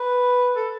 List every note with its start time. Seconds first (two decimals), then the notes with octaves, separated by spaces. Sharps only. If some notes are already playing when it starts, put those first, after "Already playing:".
Already playing: B4
0.56 A4